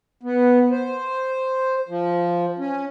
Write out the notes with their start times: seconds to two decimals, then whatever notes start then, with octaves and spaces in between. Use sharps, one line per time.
0.23 B3
0.71 C5
1.89 F3
2.59 C#4